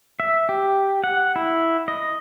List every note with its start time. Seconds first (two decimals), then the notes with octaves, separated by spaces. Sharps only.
0.20 E5
0.49 G4
1.04 F#5
1.36 E4
1.88 D#5